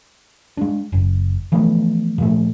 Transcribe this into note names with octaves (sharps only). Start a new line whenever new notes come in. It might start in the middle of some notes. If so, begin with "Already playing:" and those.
G#3 D4
F#1
E3 F3 A3 B3
A#2 F3 A3